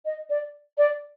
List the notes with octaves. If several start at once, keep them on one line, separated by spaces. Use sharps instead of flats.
D#5
D5
D5